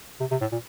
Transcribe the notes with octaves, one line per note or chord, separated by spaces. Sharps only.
C3
C3
A2
A#2